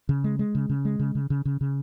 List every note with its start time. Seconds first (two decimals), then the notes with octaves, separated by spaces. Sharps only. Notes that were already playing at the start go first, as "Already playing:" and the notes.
0.09 C#3
0.24 G#3
0.39 G#3
0.55 C#3
0.70 C#3
0.85 G#3
1.00 C#3
1.15 C#3
1.30 C#3
1.45 C#3
1.61 C#3